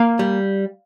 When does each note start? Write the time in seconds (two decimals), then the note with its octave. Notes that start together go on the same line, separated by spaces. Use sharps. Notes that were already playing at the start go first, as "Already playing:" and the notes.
Already playing: A#3 F5
0.19 G3